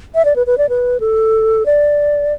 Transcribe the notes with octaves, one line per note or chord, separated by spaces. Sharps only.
E5
D5
B4
B4
D5
B4
A4
D5